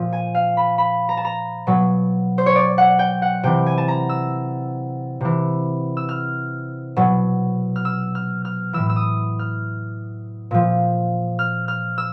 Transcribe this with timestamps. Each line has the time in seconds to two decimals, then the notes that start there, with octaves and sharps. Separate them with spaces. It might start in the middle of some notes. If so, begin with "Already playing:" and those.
Already playing: A#2 F3
0.13 G#5
0.35 F5
0.57 B5
0.78 B5
1.09 A#5
1.17 A5
1.25 A#5
1.67 B2 F#3
2.38 C5
2.46 C#5
2.56 D5
2.78 F#5
2.99 G5
3.22 F#5
3.43 C3 E3 G5
3.66 G#5
3.78 A5
3.88 A#5
4.09 E6
5.21 C3 E3
5.97 E6
6.09 F6
6.96 B2 F#3
7.76 F6
7.85 E6
8.15 F6
8.45 F6
8.73 A2 E3 E6
8.89 E6
8.96 D#6
9.39 F6
10.51 A#2 F3
11.39 F6
11.68 F6
11.98 E6